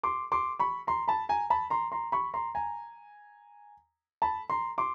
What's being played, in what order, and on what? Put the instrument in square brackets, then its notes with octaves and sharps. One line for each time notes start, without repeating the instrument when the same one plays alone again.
[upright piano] C6 D6
C6 D6
B5 C#6
A#5 C6
A5 B5
G#5 A#5
A5 B5
A#5 C6
A#5 C6
B5 C#6
A#5 C6
G#5 A#5
A5 B5
A#5 C6
C6 D6